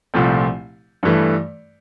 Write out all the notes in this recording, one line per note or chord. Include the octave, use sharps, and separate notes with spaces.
C2 A#2 F3 A3 C4
G2 E3 A3